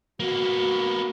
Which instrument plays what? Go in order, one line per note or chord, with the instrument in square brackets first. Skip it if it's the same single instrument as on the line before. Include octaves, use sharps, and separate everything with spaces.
[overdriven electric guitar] A#3 B3 [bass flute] F#4